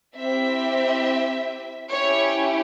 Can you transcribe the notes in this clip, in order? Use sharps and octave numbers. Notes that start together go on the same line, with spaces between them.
C4 E4 G4 E5
C#4 E4 G4 C#5